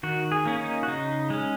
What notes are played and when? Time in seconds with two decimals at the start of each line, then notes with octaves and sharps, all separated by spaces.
0.03 D#3 F#4
0.32 G#4
0.45 A#3 C#4
0.59 D#4
0.83 F#4
0.88 C#3 D#4
1.30 G#3 C#4